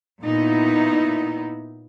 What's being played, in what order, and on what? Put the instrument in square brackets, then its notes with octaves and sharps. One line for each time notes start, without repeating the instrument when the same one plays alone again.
[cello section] A#2 B3 D#4 E4